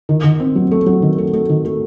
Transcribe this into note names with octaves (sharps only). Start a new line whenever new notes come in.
D#3
D#3
C4
F#3
A3
F#3
D#3
A3
A3
D#3
A3